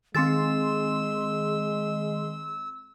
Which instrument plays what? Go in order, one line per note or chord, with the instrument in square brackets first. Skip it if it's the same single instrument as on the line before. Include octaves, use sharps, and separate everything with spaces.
[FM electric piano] D#3 G#4 C6 [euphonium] G#3 [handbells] C4 A6 [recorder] E6